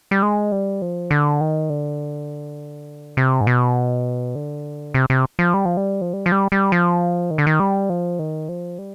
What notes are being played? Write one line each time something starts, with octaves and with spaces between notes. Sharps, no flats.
G3
G#3
G3
F3
D3
D#3
D3
C3
G#2
B2
D3
C3
C3
F3
G3
F3
G3
F3
G3
F3
G3
G3
F3
D#3
D3
D#3
G3
F3
D#3
F3
G3